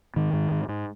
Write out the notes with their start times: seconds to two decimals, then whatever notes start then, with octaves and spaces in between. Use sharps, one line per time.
0.16 G#2 D#3
0.33 G#2
0.51 G#2
0.68 G#2